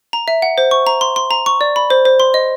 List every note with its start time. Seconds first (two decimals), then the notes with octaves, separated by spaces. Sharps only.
0.13 A#5
0.28 E5
0.42 F#5
0.58 C5
0.71 C#6
0.87 A#5
1.01 C6
1.16 C6
1.31 A#5
1.46 C#6
1.61 D5
1.76 B5
1.90 C5
2.05 C5
2.20 C6
2.34 D#5